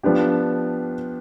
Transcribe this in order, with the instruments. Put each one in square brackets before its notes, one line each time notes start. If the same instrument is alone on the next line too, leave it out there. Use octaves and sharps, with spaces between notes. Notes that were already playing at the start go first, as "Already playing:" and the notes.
[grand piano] F3 B3 D4 G4